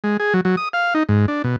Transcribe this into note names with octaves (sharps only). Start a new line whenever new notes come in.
G#3
G#4
F#3
F#3
D#6
F5
D#4
G#2
D4
B2